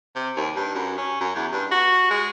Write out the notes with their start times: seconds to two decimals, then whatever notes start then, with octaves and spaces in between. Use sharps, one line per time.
0.15 C3
0.36 D#2
0.56 G2
0.75 F#2
0.98 C#4
1.21 F#2
1.36 E2
1.52 G2
1.71 F#4
2.10 G#3